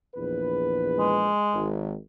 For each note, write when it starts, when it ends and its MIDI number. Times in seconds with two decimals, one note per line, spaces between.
0.15 1.31 34
0.15 1.31 40
0.15 1.31 71
0.99 1.71 56
1.54 1.95 32